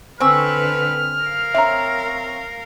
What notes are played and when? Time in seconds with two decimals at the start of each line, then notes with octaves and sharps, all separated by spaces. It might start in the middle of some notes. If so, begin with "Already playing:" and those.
0.20 D3 C4 B4 C5 G#5 C#6 E6 F6
1.21 A#4 F5
1.54 C4 C#5 E5 A#5